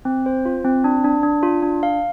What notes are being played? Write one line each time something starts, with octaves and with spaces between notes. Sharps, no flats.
C4
C5
F4
C4
D4
D4
D4
F4
D4
F5